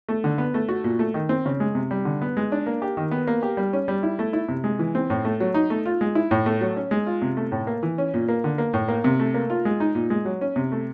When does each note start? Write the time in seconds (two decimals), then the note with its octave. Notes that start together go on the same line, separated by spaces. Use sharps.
0.09 A3
0.24 D3
0.38 B3
0.54 A3
0.69 F#4
0.84 A#2
0.99 A3
1.14 D#3
1.29 C4
1.46 C#3
1.60 G#3
1.75 C3
1.91 G3
2.05 D3
2.22 B3
2.37 G#3
2.52 D4
2.66 A#3
2.82 G4
2.97 D#3
3.11 B3
3.27 A#3
3.42 G4
3.57 G3
3.73 C#4
3.88 G3
4.03 E4
4.19 A3
4.33 E4
4.49 C3
4.64 G#3
4.79 E3
4.95 C4
5.10 A2
5.25 A3
5.40 F#3
5.54 D#4
5.70 A3
5.85 F4
6.01 G#3
6.15 E4
6.31 A2
6.46 A3
6.61 F#3
6.77 C#4
6.91 G#3
7.07 F4
7.22 C3
7.37 A3
7.52 A2
7.67 A#3
7.83 E3
7.98 C#4
8.14 A#2
8.29 A#3
8.44 D3
8.58 A#3
8.74 A2
8.88 A#3
9.04 C3
9.20 A3
9.34 A#3
9.50 F4
9.65 G#3
9.80 D#4
9.95 A#2
10.10 G#3
10.25 F#3
10.41 C#4
10.56 C3
10.72 A3